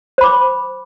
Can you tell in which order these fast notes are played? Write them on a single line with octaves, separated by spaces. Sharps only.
C5 B5 D6